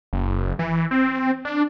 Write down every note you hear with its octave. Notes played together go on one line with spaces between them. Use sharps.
F#1
E3
C4
D4